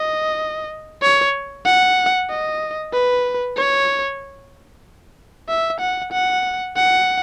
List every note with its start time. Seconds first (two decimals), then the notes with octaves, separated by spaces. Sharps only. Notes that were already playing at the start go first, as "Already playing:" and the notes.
Already playing: D#5
1.02 C#5
1.65 F#5
2.29 D#5
2.93 B4
3.57 C#5
5.48 E5
5.80 F#5
6.12 F#5
6.76 F#5